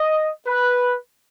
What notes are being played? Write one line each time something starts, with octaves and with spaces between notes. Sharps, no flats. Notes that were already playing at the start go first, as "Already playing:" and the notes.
Already playing: D#5
B4